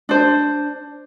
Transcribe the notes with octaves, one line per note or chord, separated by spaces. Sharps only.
D4 C5